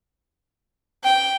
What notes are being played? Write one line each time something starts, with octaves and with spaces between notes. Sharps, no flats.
G5